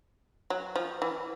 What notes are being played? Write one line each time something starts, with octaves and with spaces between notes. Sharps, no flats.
F#3
F3
E3